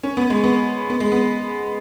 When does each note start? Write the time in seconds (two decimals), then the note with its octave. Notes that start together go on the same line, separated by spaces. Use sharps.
0.03 C#4
0.17 B3
0.30 G#3
0.44 B3
0.90 B3
1.00 G#3
1.12 B3